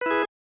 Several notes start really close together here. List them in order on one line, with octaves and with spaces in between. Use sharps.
B4 E4 G#4